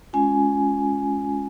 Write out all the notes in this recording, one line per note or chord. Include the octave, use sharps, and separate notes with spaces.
G#3 C#4 F4 G#5